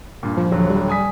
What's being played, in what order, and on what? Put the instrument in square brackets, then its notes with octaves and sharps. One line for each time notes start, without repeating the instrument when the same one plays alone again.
[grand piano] G2 A#2
[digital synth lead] F3
[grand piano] D#1 D3 F#3
[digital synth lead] G3
[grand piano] G#5 D#6 B6